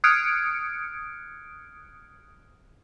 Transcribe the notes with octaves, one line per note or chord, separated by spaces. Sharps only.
D#6 F6 F#6 G#6 C#7 D7